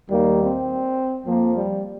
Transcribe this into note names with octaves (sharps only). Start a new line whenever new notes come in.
D#2 D#3 G3 A#3
C4
F2 F3 A#3
G3